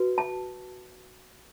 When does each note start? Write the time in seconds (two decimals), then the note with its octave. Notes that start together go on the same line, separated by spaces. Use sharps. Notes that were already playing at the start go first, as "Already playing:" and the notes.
Already playing: F#4 B4
0.18 A5